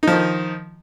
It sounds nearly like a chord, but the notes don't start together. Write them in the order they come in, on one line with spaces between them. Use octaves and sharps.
D#4 F3 D#3